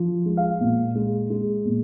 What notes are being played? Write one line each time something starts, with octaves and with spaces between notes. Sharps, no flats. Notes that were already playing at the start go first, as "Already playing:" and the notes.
Already playing: F3
G#3
F5
A#2
G#3
G#3
A#2